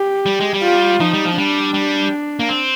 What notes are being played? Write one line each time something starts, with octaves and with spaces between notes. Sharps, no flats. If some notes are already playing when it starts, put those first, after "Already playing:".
Already playing: G4
G3
G#3
G3
F4
F3 D#4
G3
F3
G3 D4
G3
A#3
C4